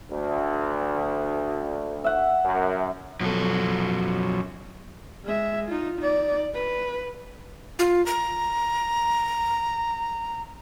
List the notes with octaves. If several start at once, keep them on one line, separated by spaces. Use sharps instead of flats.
D2
E5 F#5
F#2
F#2 B2 F3 F#3 A4
G#3 E5
D#4 F4
D#4 D5
B4
F4
A#5